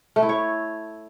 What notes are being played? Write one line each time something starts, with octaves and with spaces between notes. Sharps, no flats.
A3
E4
C#5